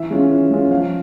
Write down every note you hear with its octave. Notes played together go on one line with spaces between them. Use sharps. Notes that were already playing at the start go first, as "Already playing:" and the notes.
Already playing: E3 E5
G#3 C#4 F4
E3
G#3 C#4 F4
F3 F5